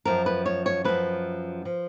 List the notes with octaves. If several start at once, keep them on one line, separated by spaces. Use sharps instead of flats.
F#2 F3 A#4
B4
C#5
C#5
F#2 F3 B4
F3